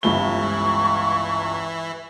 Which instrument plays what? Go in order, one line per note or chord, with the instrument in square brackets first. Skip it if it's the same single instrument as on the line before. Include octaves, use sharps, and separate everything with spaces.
[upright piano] G1 C#2 G7 [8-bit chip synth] E3 E4 [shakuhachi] C#6